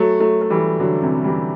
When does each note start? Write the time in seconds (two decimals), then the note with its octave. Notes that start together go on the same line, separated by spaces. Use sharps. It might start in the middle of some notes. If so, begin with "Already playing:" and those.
Already playing: F#3 A3
0.20 F#3 A3
0.41 A3
0.50 E3 G3
0.80 D3 F#3
1.02 C3 E3
1.24 E3 G3